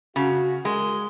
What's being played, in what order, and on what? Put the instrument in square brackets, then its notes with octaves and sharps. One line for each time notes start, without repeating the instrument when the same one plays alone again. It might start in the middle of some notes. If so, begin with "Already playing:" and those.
[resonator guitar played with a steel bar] C#3 [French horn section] F#4
[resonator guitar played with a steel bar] G#3 [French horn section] F#4 A#4